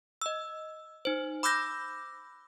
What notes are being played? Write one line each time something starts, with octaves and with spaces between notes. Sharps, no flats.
D#5 E6
D#4 C5
B5 D6 E6 F#6 G6 A#6